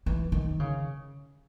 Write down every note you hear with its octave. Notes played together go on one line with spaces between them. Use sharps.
E3
D#3
C#3